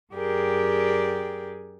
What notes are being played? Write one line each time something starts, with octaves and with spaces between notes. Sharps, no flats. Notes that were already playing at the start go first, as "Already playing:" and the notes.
F#2 G4 G#4 A#4 D5 G5